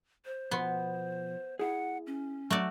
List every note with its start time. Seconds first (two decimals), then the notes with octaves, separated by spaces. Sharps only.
0.25 C5
0.51 B2 F3 B3 C6
1.59 E4 G#4 F#5
2.07 C#4
2.50 F#3 A3 F#4 D5